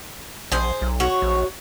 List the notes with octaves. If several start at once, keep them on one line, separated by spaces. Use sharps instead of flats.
A#1 G#4 C5
B1
F#4 C#5
A#1